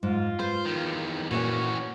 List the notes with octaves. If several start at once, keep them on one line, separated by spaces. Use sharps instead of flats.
G#2 F4
B4 C5
E2 D#3
A#2 E3 C#4 F#4 C5 G#5